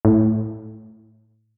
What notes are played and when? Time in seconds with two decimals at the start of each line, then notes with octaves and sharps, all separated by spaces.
0.05 A2